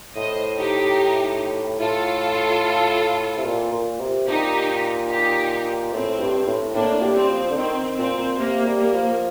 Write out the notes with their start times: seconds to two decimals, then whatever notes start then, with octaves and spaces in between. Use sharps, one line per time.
0.16 A2 C5 D#5
0.57 D#4 G4
1.80 A2 F4 A4
3.38 C3
3.45 A#2
3.72 A#2
4.00 C3
4.27 A#2 D#4 G4
5.10 D#4 G4
5.92 A2 C4
6.20 G2
6.47 A2
6.74 A2 A#3 D4
7.02 G3
7.16 C4
7.29 F3
7.50 D3
7.57 D#3 C4
7.97 A#2 C4
8.18 A#2
8.38 C3 A#3
8.66 G3
8.80 A#3
8.93 F3